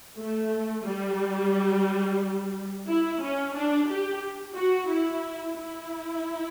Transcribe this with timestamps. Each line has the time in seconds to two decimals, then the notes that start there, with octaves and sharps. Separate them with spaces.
0.18 A3
0.85 G3
2.87 E4
3.21 C#4
3.55 D4
3.88 G4
4.55 F#4
4.89 E4
5.56 E4